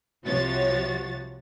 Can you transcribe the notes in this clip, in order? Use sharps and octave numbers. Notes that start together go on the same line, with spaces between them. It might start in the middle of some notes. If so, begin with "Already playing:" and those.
C2 C3 F3 F#4 C#5 A6